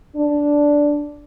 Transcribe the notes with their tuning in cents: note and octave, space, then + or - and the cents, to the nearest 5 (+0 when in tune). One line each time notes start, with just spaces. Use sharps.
D4 -5